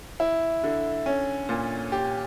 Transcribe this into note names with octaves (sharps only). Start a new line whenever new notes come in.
E4
D3
C#4
A#2
G4